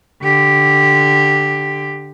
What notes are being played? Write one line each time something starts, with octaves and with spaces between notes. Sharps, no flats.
D3 G4